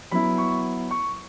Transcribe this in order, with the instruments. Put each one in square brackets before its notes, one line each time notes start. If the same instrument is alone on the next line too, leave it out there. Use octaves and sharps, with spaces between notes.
[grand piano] F#3 B3 E4 B5
C#6
C#6